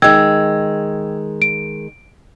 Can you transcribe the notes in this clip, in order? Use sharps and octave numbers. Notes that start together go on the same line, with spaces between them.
D#3 G#3 G5 E6 G#6
D7